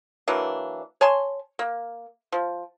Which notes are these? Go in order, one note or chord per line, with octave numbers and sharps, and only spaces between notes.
E3 F#3 A#3 D4
C#5 G#5 A5 C6
A#3
F3